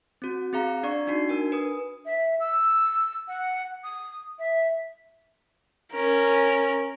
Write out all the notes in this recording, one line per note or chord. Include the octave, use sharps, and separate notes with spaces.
C4 F#4
C4 G#4 F5 A#5
D4 D5 C#6
D4 D#4 F#4 C7
D4 A#4 G#5
B4 D#6
E5
E6
F#5
D#6
E5
C#4 A#4